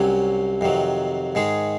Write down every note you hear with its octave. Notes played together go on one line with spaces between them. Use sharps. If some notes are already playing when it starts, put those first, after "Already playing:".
Already playing: C2 C3 F#3 C#4
F2 C3 D#3 F#3
G#2 D#3 G#3 D#4 G#4